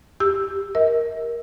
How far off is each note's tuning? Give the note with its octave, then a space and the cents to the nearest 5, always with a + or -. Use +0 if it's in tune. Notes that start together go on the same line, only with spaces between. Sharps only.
G4 +0 E6 +0
A#4 +10 D#5 +45